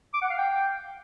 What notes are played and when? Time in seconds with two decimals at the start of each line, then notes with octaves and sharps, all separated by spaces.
0.14 D6
0.22 F#5
0.30 F5
0.38 G5